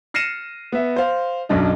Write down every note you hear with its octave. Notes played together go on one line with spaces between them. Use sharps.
F6 A#6 C7 C#7 D#7 E7
B3 E5
C5 F5
B1 F#2 D4 D#5